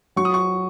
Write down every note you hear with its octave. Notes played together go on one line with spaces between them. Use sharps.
F#3 C#6
D#6
C#6